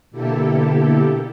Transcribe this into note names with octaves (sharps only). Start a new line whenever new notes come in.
B2 D3 A#3 E4 G4 A4